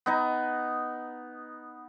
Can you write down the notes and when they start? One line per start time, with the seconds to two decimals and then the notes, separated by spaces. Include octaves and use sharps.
0.06 B3 D#4 A#5